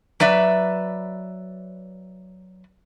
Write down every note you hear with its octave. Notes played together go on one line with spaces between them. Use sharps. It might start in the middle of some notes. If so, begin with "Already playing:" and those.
F#3 B4 D5 E5